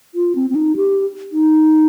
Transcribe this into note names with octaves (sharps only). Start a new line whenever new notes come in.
F4
C4
C4
D#4
G4
D#4